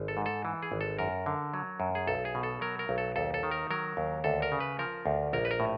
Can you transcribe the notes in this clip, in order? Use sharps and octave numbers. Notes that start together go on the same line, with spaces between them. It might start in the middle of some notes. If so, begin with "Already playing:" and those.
Already playing: G#1
A4
G#2
A4
E3
G#4
G#1
A4
F#2 A#4
D3
F#3
F#2
G#4
B1 A4
G#4
B2
A4
F#3 A#4
A#4
B1
A4
D#2 A4
A4
D#3
A#4
F#3 A#4
D#2
D2 A4
A#4
C#3
B4
F3 A#4
D2
A#1 A#4
B4
A#4
A2